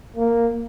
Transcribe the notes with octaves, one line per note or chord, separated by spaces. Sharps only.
A#3